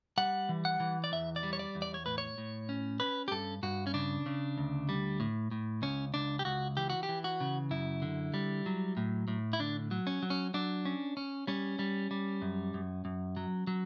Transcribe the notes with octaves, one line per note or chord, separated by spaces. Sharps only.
G3 F#5
E3
F#5
E3
D5
E2 E5
D5
G3
C#5
D5
E2
D5
C#5
A2 B4
C#5
A2
C#4
C#4 B4
G4
G2 A4
G2 F#4
C#4
C#3 D4
C#3
D2
G3
A2
A2
C#2 C#4
C#2 D4
G4
C#2 F#4
E3 G4
F#4
G4
E3
F#4
C#3
F#2 E4
D3
G3
F#3
A2
A2
E4
D3 D4
F#3
C#4
F#3
C#4
F#3 D4
C#4
C#4
G3 C#4
G3
G3
F#2
F#2
F#2
F#3
F#3